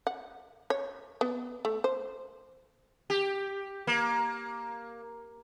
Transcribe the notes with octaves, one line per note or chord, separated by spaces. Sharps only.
F#5
C#5
B3
A3
C5
G4
A#3